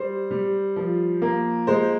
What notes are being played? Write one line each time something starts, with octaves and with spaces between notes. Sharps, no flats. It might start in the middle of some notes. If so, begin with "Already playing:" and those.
Already playing: G3 C5
G3
F3
A#3
G#3 C5